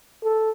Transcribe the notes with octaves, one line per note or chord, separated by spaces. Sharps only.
A4